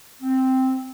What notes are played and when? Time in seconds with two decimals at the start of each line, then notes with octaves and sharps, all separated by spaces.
0.22 C4